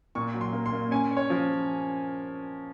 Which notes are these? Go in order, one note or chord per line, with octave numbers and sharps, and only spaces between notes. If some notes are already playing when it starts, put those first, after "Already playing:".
A#2 C#6
F#3
C6
A#3
C6
A#3
C#4 G#5
C#4
C#5
F3